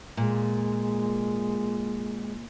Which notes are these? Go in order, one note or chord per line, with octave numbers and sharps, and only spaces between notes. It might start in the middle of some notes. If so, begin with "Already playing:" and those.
A#2 G#3